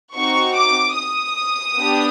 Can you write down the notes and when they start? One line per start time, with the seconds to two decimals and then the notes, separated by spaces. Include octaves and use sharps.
0.14 C4 D#4 F#4 C#6
0.56 D6
0.96 D#6
1.78 B3 D4 G4